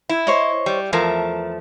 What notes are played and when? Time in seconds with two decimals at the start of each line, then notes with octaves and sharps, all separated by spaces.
0.09 E4
0.27 C5 C#5 D#5
0.66 G3
0.93 E2 F3 A3 A#4